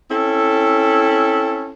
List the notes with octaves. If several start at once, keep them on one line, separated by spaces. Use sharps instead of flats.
C4 C#4 E4 A4